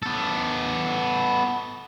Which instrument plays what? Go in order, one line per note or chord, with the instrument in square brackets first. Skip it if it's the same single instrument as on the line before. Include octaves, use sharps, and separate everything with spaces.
[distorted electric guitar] B3 A4